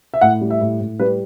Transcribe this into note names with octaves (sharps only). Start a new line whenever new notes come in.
E5
A2 F#5
G3
E5
A2
A2
G3 B4